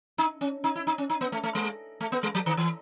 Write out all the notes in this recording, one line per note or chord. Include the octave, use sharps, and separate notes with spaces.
D#4
C#4
D#4
E4
D#4
C#4
D#4
B3
A3
A3
G#3
A3
B3
G#3
F#3
D#3
E3